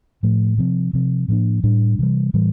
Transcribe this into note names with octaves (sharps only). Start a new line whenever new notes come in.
A2 F3 A3
C3 F3 C4
C3 F3 C4
A2 F3 A#3 D4
A2 G3 D4
C3 E3 G3
A2 E3 G3